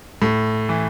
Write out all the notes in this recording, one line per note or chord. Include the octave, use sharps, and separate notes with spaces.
A2
E3